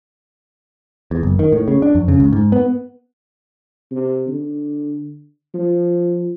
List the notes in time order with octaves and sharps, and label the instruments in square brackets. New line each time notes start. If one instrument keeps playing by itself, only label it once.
[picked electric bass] E2
F#1
D#3
A2
C#3
D4
F2
C#3
C#2
G#2
B3
[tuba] C3
D3
F3